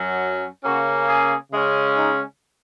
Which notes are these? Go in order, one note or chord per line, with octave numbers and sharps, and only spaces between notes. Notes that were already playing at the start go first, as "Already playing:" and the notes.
Already playing: F#2 F#3 C#4
C#3 A#3 C#4 F#4
G#4
C#3 G#3 C#4
D#4